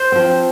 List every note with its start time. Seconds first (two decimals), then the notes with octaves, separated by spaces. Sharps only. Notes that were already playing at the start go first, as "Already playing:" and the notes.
Already playing: C5
0.12 F3 C4